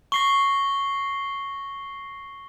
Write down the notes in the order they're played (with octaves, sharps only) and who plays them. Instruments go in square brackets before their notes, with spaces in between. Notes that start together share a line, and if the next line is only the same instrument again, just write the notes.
[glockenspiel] C#6 [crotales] A#6 C7 G7